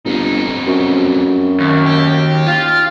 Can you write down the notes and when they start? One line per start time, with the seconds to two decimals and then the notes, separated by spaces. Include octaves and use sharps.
0.05 G1 F2 D#4
0.67 F#2
1.60 D#2
1.85 G4
2.47 F4